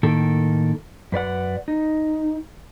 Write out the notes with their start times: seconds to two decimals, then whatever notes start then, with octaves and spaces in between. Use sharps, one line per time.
0.03 A2 D#3 A#3 A4
1.12 F#2 B4 D5 F#5
1.68 D#4